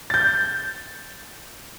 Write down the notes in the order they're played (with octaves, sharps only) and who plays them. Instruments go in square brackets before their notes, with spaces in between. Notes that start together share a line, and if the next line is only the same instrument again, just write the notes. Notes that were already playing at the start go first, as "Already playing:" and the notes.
[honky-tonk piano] G6 A6